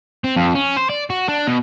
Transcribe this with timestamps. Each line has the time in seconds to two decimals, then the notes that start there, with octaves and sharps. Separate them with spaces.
0.24 C4
0.36 F2
0.55 C#4
0.77 C5
0.90 D5
1.10 F#4
1.28 D4
1.47 B2